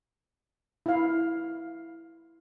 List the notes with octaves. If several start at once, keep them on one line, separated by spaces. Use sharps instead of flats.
E4 F5